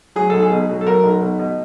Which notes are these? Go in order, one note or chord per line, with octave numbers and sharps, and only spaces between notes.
F#3 G#4
B1 A4
G#4
B2
F#3
A4
F#3 A#4
B1
B2
B2